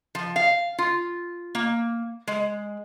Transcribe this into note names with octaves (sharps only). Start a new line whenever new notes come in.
F3
F5
F4
A#3
G#3